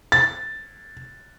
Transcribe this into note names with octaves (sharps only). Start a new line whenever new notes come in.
A6